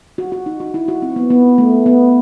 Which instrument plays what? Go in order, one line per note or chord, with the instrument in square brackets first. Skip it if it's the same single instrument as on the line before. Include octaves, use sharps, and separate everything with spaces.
[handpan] F#4
F#4
D#4
F#4
E4
F#4
C4
B3
B3
A3
B3